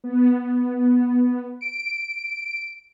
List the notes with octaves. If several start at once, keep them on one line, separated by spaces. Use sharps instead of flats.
B3
D7